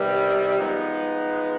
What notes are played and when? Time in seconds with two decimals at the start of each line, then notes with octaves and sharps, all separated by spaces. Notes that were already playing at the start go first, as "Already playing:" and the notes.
Already playing: C3 D#3 G3 B3
0.57 F3 G#3 B3 D#4